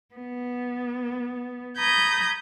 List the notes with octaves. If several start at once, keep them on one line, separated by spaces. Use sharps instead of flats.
B3
A#5 B5 D#6 G6 G#6